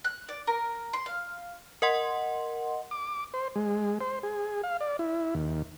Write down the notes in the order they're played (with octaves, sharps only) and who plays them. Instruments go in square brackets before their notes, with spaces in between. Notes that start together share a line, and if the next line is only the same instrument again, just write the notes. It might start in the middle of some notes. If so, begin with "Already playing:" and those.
[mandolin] F#6
D5
A#4
C6
F5
[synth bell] A#4 D#5 F#5 C6
[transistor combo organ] D6
C5
G#3
C5
G#4
F5
D5
E4
D#2